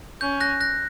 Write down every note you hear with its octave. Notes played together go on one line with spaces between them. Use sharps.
C#4 G6
F#6 A#6
F#6 A#6